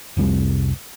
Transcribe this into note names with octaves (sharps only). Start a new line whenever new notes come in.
F1 C2 C3 G3